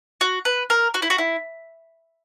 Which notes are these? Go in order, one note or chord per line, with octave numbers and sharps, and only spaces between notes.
F#4
B4
A#4
F#4
E4
F#4
E4